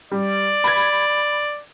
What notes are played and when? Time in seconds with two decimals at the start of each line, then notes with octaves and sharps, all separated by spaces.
0.12 G3 D5
0.64 B5 G#6